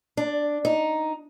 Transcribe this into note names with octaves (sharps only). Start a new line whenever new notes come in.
D4
D#4